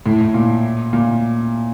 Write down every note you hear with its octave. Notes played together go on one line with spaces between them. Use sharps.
A2
A2
A#2
A#2